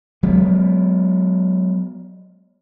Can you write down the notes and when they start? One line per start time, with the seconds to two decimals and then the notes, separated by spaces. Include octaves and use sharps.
0.23 F#3 G#3 B3